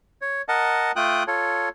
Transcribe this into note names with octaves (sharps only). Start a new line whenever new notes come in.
C#5
A#4 D#5 F#5 A5
A3 F4 G5 D#6 F#6
F4 A4 C#5